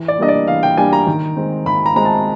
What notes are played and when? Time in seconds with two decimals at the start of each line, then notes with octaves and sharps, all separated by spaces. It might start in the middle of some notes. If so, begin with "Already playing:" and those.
Already playing: E3
0.08 D5
0.19 G3 A#3 D4 D#5
0.28 D5
0.48 E3 F5
0.63 G5
0.77 G3 A#3 D4 G#5
0.93 A#5
1.07 D#3
1.37 G#3 C4
1.66 D#3 B5
1.86 A#5
1.96 G#3 C4 A#5
2.05 A5